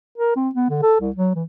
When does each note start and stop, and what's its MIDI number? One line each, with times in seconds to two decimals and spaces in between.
0.18 0.34 70
0.36 0.49 60
0.55 0.69 59
0.70 0.80 50
0.83 0.96 69
1.00 1.11 36
1.16 1.31 54
1.35 1.43 52